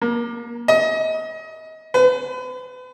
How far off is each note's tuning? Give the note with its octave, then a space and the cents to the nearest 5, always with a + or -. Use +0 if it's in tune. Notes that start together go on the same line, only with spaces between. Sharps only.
A#3 +30
D#5 +30
B4 +40